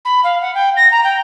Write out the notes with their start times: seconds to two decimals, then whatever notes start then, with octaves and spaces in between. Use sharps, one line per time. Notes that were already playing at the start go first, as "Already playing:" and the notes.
0.05 B5
0.24 F5
0.42 F#5
0.55 G5
0.77 A#6
0.92 A#5
1.04 G5